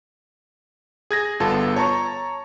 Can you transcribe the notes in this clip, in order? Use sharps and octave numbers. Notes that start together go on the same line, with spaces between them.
G#4 G#6 A#6
G1 B3 F4 A4 A5
C#5 A5 A#5 C#6